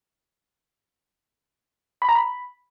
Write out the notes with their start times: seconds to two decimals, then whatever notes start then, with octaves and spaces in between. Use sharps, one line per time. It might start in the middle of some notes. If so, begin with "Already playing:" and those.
2.02 B5
2.09 A#5
2.15 B5